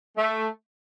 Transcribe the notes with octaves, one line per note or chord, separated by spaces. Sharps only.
A3